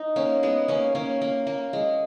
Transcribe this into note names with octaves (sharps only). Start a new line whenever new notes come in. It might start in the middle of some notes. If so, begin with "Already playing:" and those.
Already playing: D#4
A#3 C#4
G#3 B3
A#3 C#4
A#3 C#4
A#3
A#3
G#3